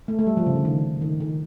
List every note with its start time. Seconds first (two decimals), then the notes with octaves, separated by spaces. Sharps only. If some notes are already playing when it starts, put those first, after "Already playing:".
0.08 A3
0.19 A3
0.27 G3
0.37 F3
0.46 C#3
0.55 D3
0.65 D#3
1.01 D#3
1.20 D#3